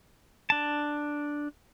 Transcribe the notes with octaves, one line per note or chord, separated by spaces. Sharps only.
D4 A5